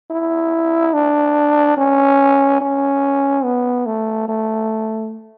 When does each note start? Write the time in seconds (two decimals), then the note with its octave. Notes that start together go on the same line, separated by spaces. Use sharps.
0.11 E4
0.93 D4
1.77 C#4
2.61 C#4
3.44 B3
3.86 A3
4.28 A3